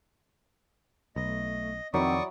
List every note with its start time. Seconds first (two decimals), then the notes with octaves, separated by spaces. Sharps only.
1.16 B1 A3 D#5
1.94 F2 D#3 F#3 C4 E4 D5 C#6 D#6